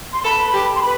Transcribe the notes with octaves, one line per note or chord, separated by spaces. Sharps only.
C6
A4 B4 B5
G4
C6
B4 B5